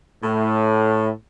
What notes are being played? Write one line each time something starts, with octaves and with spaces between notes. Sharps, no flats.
A2